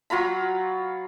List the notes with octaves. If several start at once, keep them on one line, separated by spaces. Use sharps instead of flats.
F#3 F4 A#5 B5